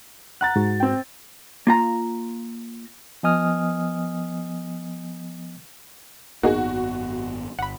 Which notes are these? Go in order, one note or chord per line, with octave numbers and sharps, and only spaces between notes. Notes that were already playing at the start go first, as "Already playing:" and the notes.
F#5 A#5 F#6 A6
G#2 F#4
C4 G5
A#3 F4 A#5
F3 B3 D#5 G#5 D#6 F6
G#1 F#2 A#3 B3 D#4 F#4 G#4
G1 F#5 B5